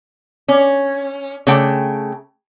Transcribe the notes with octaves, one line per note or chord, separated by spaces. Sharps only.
C#4
C#3 A3 G5